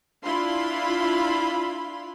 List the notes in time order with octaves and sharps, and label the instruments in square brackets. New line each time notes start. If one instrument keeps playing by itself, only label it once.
[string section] D4 E4 F4 F5 B5 C6